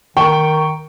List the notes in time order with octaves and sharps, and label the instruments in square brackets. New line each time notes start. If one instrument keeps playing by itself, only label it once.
[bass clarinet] D#3 [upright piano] G5 C#6